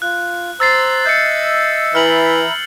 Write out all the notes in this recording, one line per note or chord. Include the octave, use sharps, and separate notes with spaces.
F4 F#6
C5 A#5 E6 A6 C7
D#5 E5 E6 G6 C#7
E3 E5 A#5 B5 F6 F#7